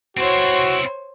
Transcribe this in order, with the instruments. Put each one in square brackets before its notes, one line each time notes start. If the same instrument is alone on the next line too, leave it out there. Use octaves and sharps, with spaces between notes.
[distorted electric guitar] C4 E4 [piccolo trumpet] F#4 [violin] C5 C#5